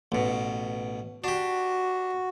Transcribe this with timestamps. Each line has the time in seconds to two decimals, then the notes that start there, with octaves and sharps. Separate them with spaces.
0.12 A1 B2
1.24 D4 F#4 G4